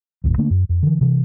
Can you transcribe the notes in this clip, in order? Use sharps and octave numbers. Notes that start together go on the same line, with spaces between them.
D#1 G#1 D#2
D3 A3 A#3 D4
F#2
F2
D3 E3
C3 E3